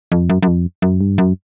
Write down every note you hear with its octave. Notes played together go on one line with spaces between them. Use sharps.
F2
F#2
F#2
F2
F#2
G2
F#2